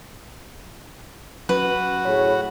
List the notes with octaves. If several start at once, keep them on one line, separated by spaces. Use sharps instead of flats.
F#3 C#4 F#4 B4
A2 G#4 C#5 B5